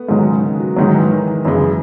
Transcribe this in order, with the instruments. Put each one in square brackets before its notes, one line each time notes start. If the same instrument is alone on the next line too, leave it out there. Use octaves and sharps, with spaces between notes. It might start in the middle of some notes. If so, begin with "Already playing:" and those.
Already playing: [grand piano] A3 B3
[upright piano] G#2 D#3 F#3 [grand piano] G#3
[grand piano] C#3
D#3
F#3
[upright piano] G#2 D#3 F#3 [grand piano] G#3
[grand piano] E3
D#3
D#3
[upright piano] F#2 C#3 G#3 [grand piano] E3